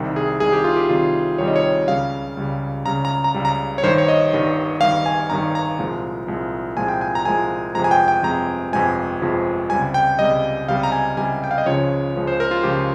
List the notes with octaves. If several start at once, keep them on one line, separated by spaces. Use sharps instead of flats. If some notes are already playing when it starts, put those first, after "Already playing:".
Already playing: C2 C3 D#3 G3
G#4
C2 C3 D#3 G3 G#4
G4
F4
G4
C2 C3 D#3 G3 F4
C2 C3 D#3 G3 C#5
D#5
C#5
C#2 C#3 G3 F5
C#2 C#3 G3
C#2 C#3 G3 A#5
A#5
A#5
C#2 C#3 G3
A#5
C#5
G1 G2 D#3 G3 C5
C#5
D#5
G1 G2 D#3 G3
G1 G2 D#3 G3 F5
G#5
G1 G2 D#3 G3 A#5
A#5
C2 A#2 F3 G#3
C2 A#2 F3 G#3
C2 A#2 F3 G#3 G#5
G5
G#5
A#5
C2 A#2 F3 G#3 G#5
G1 F2 C3 F3 G#3 A#5
G#5
G5
G5
G1 F2 C3 F3 G#3 A#5
G1 F2 C3 F3 G#3 G#5
G1 F2 C3 F3 G#3
C#2 C3 G3 G#5
G5
C#2 C3 G3 D#5
C#2 C3 G3 F5
A#5
G#5
C#2 C3 G3 G#5
G5
F5
D#5
C#2 C#3 F3 G#3 C#5
C#2 C#3 F3 G#3
C5
A#4
F4
C#2 C#3 F3 G#3 G4